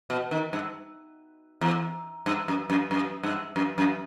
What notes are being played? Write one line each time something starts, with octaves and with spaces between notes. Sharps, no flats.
B2
D#3
G2
E2
G2
F#2
F#2
F#2
G2
F#2
F#2